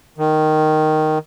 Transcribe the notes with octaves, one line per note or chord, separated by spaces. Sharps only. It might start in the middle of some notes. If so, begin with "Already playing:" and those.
D#3